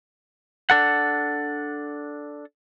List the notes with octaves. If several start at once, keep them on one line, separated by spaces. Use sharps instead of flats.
D4 A4 F#5